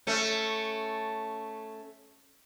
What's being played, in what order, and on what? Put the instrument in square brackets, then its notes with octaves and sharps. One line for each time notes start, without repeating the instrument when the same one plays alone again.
[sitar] A3 C#4